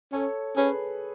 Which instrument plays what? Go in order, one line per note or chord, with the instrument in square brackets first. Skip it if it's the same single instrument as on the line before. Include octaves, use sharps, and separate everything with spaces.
[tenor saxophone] C#4 [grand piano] A4 C#5
[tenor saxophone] C#4 [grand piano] G#4 B4